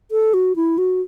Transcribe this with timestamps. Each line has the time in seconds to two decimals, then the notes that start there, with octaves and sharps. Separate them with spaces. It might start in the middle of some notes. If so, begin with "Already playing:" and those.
0.11 A4
0.34 F#4
0.56 E4
0.78 F#4